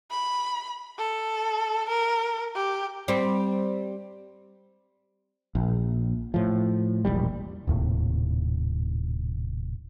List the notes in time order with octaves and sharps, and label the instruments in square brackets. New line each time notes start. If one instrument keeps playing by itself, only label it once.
[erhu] B5
A4
A#4
G4
[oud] G3 C4
[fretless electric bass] A#1
A2 F3
E1 A#1 G3
[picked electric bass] D#1 D#2 A2 C3